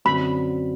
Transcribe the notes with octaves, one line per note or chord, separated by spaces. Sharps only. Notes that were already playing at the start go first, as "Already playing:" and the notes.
F#2 D3 F#3 C4 B5